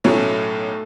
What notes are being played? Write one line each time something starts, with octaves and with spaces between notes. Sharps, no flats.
B1 A2 F#3 A3 C#4